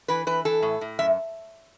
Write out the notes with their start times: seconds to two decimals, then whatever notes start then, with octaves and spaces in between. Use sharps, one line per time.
0.08 E3 B4
0.27 E3 B4
0.45 E3 A4
0.62 A2
0.81 A2
0.99 F#2 E5